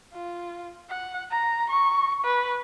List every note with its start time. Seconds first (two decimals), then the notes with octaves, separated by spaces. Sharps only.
0.13 F4
0.89 F#5
1.31 A#5
1.70 C#6
2.25 B4